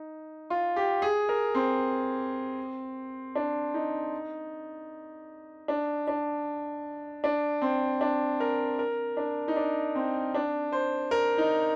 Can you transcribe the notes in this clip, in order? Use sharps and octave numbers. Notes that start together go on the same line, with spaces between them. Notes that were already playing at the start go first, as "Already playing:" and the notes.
Already playing: D#4
F4
G4
G#4
A#4
C4
D4
D#4
D4
D4
D4
C4
D4
A#4
A#4
D4
D#4
D4
C4
D4
C5
A#4
D#4